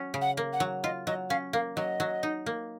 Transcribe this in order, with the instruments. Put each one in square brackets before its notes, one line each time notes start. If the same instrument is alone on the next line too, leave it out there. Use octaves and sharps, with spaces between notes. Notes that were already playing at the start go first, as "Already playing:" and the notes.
Already playing: [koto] F#3 C#4
C#3
[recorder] F#5
[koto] A#3
[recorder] F#5
[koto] F#3
[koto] F4 [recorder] D#5
[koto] F#3 [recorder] D#5
[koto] C#4 [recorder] F5
[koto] A#3 [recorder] F5
[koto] F#3 [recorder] D#5
[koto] F#3
D#4
A#3